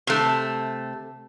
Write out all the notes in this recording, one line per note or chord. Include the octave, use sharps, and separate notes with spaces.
C3 A3